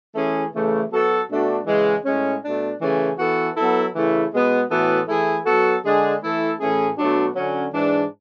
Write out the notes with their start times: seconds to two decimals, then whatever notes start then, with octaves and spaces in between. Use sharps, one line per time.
0.14 E3 A3 C#4 G#4
0.53 C#3 E3 A3
0.90 F#3 B3 F#4 A4
1.29 B2 A3 D4 F#4
1.67 C#3 E3 G#3
2.05 A2 G#3 C#4
2.43 B2 A3 D4
2.81 C#3 E3 A3 C#4 G#4
3.18 E3 B3 F#4 A4
3.56 F#3 B3 E4 A4
3.95 C#3 E3 A3 E4
4.33 B2 G#3 B3
4.70 A2 E3 B3 F#4 A4
5.08 E3 A3 E4 G#4
5.46 F#3 B3 F#4 A4
5.84 D3 G#3 D4 G#4
6.22 E3 A3 E4 A4
6.60 A2 E3 A3 C#4 G#4
6.98 B2 F#3 A3 D4 F#4
7.35 D3 F#3 C#4
7.73 G#2 E3 G#3 D4